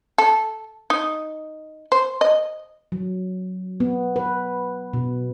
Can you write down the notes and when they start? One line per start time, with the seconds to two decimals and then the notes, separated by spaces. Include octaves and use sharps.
0.18 A4
0.90 D#4
1.92 C5
2.21 D#5
2.92 F#3
3.80 B3
4.16 B4
4.93 B2